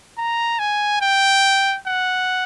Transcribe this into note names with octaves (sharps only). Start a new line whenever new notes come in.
A#5
G#5
G5
F#5